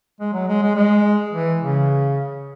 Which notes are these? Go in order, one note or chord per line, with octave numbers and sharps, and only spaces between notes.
G#3
F#3
G#3
G#3
G#3
E3
C#3